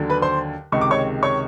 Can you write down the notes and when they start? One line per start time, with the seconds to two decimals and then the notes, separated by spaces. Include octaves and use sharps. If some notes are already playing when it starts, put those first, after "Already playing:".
Already playing: D#2 D3 F#3
0.10 B4 B5
0.22 C5 C6
0.72 C#2 C3 D#3 G#3 C#6
0.81 D6
0.91 C#5 C#6
1.23 C#5 C#6